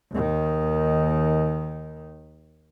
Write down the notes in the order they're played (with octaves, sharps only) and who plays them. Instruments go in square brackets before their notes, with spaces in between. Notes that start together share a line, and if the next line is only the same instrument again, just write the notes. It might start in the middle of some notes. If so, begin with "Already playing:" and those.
[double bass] D#2 D#3